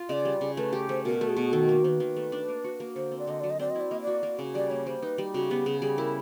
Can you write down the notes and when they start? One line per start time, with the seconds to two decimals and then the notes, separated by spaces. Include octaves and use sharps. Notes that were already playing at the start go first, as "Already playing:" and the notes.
Already playing: F4
0.09 C#3 D5 D#5
0.25 G3
0.41 C#3
0.57 A3 B4
0.72 G4
0.89 A3 C5
1.05 B2 A#4
1.21 A3
1.29 G#4
1.37 B2
1.53 D#3 A4
1.69 A#3 A#4
1.84 D#3 B4 C5
2.00 D#3
2.16 A3
2.32 D4
2.48 A#3
2.64 F#4
2.80 A#3
2.96 D3 C5
3.12 C4
3.19 D5
3.27 D3 D#5
3.40 F#3 D5
3.51 D#5
3.59 C4 D5
3.70 D#5
3.75 E4 D5
3.91 A#3 D#5
4.02 D5
4.07 F#4
4.23 A#3
4.39 C#3
4.55 G3 D5
4.70 A#3 C#5
4.87 G3 C5
5.03 D#4 B4
5.18 G3
5.34 C#3 F#4
5.50 B3 G4
5.66 C#3 G#4
5.82 G3 G#4
5.98 E4 A#4